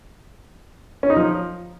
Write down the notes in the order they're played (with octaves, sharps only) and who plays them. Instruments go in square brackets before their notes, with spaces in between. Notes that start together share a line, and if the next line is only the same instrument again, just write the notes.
[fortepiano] C#4
D#4
F3